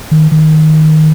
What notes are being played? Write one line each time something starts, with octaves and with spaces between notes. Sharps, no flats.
D#3
D#3